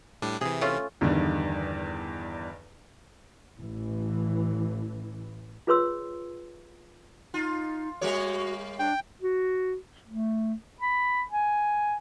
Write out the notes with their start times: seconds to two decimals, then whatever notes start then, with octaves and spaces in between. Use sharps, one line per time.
0.22 A2 G3 D4
0.41 C3 E3 G#4
0.61 A3 C#4 F4
1.01 E2 G2 D3 D#3
3.59 A1 E3
5.67 F4 G#4 B4 C#5 C6 E6
7.34 D#4 F4
8.01 G3 A#3 F#4 C#5
8.79 D4 G5
9.22 F#4
10.08 A3
10.81 B5
11.31 G#5